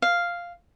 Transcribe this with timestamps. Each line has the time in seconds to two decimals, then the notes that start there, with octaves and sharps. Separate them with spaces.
0.02 F5